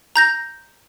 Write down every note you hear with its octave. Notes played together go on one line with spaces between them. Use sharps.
A#5 G6 A#6